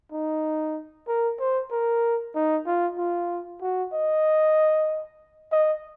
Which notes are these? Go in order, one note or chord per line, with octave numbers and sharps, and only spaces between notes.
D#4
A#4
C5
A#4
D#4
F4
F4
F#4
D#5
D#5